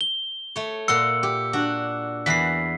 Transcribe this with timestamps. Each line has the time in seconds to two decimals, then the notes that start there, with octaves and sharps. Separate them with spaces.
0.01 G7
0.56 A3 C#5
0.88 A#2 F#5 C6 E6 C#7
1.23 G4
1.53 D4 F#4
2.26 E2 E3 B5 B6 C7